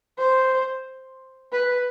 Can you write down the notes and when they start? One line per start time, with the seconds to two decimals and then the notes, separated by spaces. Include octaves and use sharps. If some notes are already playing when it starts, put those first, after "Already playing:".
0.18 C5
1.53 B4